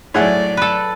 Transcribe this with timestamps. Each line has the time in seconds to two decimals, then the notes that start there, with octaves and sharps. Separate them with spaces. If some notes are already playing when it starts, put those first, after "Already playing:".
0.14 A2 F#3 G#4 D5 F#5
0.57 A4 B4